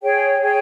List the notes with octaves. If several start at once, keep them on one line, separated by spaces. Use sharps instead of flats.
G#4 C#5 G5
G#4 C#5 G5